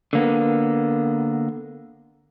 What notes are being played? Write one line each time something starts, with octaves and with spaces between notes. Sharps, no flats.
D3 A#3 B3